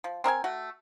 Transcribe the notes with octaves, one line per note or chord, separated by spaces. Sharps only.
F3
C4 A#4 D#5 G#5
A3 F#4